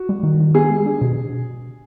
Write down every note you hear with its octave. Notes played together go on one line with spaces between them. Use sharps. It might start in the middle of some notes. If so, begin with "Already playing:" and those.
Already playing: F#4
G3
D#3
D#3
B3 G#4
G#3
D4
B2